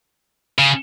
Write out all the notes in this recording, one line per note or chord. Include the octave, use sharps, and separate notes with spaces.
C#3